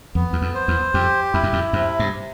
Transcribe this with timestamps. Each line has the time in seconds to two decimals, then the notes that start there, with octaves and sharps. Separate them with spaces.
0.15 F2 B3
0.33 E2
0.42 F2
0.54 C5
0.68 E2
0.94 F2 G4
1.33 F2 E4
1.43 F#2
1.53 F2
1.73 F#2 C3
1.99 G2
2.13 C3